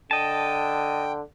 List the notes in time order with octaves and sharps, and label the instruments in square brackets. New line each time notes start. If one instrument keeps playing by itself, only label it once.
[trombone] D3 [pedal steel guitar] D#5 A5 [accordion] G5